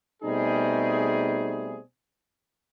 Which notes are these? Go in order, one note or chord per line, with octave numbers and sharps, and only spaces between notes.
B2 G3 A3 C4 D#4 G#4